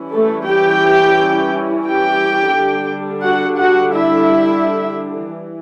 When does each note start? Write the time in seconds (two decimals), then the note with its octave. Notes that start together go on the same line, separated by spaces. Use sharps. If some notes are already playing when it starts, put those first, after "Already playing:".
Already playing: E3 G3 C#4 E4
0.12 A3 A4
0.47 G4 G5
1.86 G4 G5
2.55 D3 G3 D4
3.24 F#4 F#5
3.58 F#4 F#5
3.93 E4 E5
5.31 E3